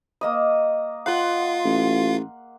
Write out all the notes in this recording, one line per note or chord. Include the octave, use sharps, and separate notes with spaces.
A#3 D#5 D#6
F4 F5 F#5 C6
A1